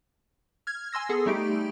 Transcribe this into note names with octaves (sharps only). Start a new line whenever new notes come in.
F6 G#6
G#5 C6 E6 A#6
B3 G#4 A4
G3 A3 D#4 G4 D7